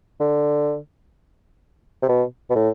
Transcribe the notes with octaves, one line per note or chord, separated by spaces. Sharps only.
D3
C3
B2
B2
A2